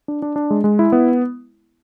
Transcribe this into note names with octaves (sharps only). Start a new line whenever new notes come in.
D4
D4
D4
G#3
G#3
E4
B3